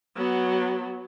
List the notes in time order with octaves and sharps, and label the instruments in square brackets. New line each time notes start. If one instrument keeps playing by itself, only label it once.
[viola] F#3 B3